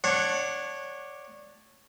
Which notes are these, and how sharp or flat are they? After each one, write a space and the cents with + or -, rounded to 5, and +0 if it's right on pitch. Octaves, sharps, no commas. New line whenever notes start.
D4 +0 C#5 -15 F#5 +0